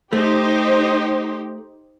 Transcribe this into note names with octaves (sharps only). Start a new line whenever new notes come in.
A3 D#4 G4 C5